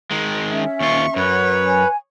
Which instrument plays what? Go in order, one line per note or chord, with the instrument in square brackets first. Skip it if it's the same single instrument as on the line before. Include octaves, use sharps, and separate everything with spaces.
[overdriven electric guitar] D#3 G#3
[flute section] C#4 E5
[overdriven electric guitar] D#2 F4 [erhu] C#6
[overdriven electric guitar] F#2 [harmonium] B4 [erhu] C#5
[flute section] G#5